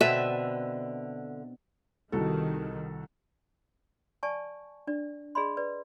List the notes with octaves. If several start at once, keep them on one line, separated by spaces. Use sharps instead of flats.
B2 D3 C4 B4 E5
C2 D#3 F#4 A4
D5 G#5 A5 C#6
D4 D5
G#4 D5 D#5 B5 C6
B4 D5